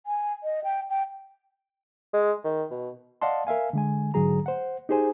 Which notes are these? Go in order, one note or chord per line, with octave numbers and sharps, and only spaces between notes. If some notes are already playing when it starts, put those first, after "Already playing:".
G#5
D#5
G5
G5
G#3
D#3
B2
D5 D#5 F5 F#5 A5 C6
A#4 E5 F5 G#5
D3 G#3 G#5
G#2 D3 F#3 G#4 A#5
C5 F#5
D#4 G4 G#4 C5 G#5